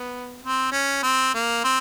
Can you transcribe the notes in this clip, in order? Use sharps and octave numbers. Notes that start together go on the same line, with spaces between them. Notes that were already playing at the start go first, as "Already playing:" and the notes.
Already playing: B3
C4
C#4
C4
A#3
C4